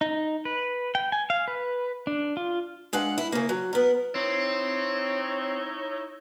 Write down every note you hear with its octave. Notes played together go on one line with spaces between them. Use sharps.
D#4
B4
G5
G#5
F5
B4
D4
F4
G#3 D4 F5 F#5
E4
C#3 A#3
F#3
B3 A#4
C4 D#4 E4 C#5